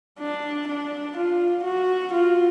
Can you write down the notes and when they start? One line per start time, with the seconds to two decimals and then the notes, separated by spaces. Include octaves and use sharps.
0.20 D4
0.68 D4
1.17 F4
1.64 F#4
2.13 F4